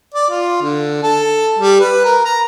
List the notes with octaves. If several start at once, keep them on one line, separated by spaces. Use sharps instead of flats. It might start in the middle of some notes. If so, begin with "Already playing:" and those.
D5
F4
D3
A4
G3
B4
A#4
A#5